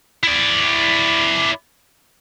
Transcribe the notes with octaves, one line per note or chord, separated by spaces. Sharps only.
E4 D5